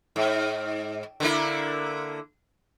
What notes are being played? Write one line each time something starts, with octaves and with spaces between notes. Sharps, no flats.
G#2
D3 A#3 E4